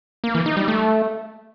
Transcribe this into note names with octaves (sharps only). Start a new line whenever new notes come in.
A#3
E3
D#4
G3
A3